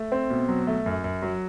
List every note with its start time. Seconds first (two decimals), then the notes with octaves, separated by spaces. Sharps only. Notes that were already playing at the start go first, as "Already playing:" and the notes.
Already playing: A3
0.12 C4
0.30 B2
0.49 F#3
0.67 A3
0.86 F#2
1.04 F#2
1.22 F#3